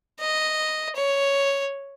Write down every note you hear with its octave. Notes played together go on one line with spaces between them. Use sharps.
D#5
C#5